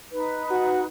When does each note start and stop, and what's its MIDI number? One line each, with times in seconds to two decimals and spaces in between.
0.11 0.85 63
0.11 0.85 71
0.51 0.81 66